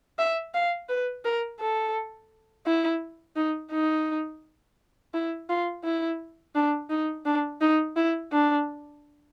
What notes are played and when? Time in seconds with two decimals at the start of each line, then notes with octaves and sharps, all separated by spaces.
0.19 E5
0.54 F5
0.89 B4
1.25 A#4
1.60 A4
2.66 E4
3.36 D#4
3.72 D#4
5.14 E4
5.50 F4
5.84 E4
6.55 D4
6.90 D#4
7.26 D4
7.61 D#4
7.97 E4
8.32 D4